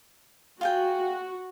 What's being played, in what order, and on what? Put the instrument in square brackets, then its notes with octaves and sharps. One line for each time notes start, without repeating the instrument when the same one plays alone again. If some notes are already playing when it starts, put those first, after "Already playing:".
[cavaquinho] F4 G#4 G5 [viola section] F#4